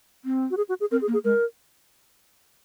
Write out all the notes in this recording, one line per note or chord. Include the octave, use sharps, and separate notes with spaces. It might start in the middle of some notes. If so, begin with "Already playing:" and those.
C4
F#4
G#4
F#4
G#4
C4 A#4
G#4
A#3
G#4
G#3 A#4